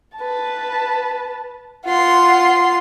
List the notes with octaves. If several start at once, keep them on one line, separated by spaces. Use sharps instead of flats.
B4 A5
F4 F#5 C6